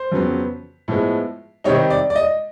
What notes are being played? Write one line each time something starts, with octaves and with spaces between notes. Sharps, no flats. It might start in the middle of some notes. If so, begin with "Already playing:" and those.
Already playing: C5
F2 C#3 F#3 B3
A2 F3 G#3 B3
C3 D#3 G3 C4 D#4 C#5
D5
D5
D#5